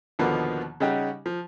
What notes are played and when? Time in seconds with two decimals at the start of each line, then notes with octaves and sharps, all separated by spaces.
0.19 D#2 B2 D3 F3 A#3 B3
0.80 C#3 G3 C#4 D#4 F#4 G4
1.26 F3